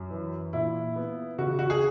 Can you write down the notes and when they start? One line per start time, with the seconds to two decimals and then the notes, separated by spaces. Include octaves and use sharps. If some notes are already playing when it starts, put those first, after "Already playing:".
Already playing: F#2
0.10 E3
0.53 A#2 E4
0.96 B3
1.38 C#3 F#4
1.59 F#4
1.70 G#4